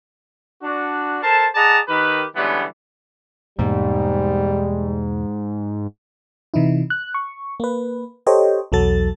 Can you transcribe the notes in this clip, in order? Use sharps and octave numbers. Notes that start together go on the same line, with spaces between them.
D4 F#4
A4 A#4 C5 A5
G#4 D5 D#5 F#5 A5 A#5
D#3 G4 A#4 B4
D3 E3 G3 G#3 B3 C#4
E2 G#2 B2 G3 A#3
C3 E3 D#4 E4
F#6
C#6
A#3 B4
G4 A4 C5 C#5 D#5 G5
B1 E2 F#3 F#4 A4 A6